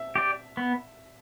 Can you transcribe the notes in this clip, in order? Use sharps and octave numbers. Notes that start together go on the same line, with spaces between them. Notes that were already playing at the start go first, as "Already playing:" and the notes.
Already playing: E5
G4 D5
B3